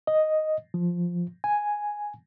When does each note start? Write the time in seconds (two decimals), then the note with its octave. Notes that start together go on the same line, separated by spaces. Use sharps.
0.07 D#5
0.74 F3
1.44 G#5